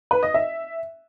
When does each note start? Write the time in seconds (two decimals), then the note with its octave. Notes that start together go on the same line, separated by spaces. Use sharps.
0.11 B4
0.23 D#5
0.34 E5